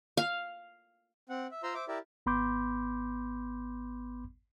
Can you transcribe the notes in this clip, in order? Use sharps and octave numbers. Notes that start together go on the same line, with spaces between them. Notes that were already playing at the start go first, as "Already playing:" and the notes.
F5
C4 F#5
E5
F4 C5 A#5 C6 E6
C5 E5 D6
E4 G4 A#4 D5 E5
G#1 B3 B5 C6 D6 G6